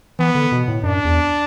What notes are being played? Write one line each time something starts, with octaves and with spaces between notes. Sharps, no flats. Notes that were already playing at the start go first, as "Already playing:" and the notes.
E3 B3
D3
B2
A2
F#2 D4
E2